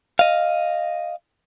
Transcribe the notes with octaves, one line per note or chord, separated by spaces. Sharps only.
D#5 F5